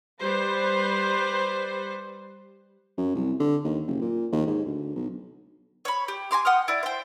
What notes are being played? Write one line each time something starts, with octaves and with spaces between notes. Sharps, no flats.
G3 B4 C5
F#2
C2
D3
D#2
F#1
A#2
D#2
G#2
D2
B1
C#5 B5
G4
G#5 A#5 C6 D6
F#5 G5 D#6 F6
E4 D5
C5 G5